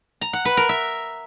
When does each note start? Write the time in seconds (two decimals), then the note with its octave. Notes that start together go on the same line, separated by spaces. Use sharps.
0.21 A#5
0.33 F#5
0.45 B4
0.57 A#4
0.69 E5